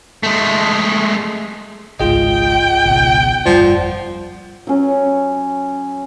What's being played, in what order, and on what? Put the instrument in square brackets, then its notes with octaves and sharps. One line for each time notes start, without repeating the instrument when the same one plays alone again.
[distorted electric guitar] G#3 A3
[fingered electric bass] G#1 C#2 G#2 [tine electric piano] F4 G#4 D#5 [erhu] G5
[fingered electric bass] G#1 C#2 B2
[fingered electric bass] G1 F2 G3 [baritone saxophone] F3 [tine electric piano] D5 F#5
[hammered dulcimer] F#3 C#4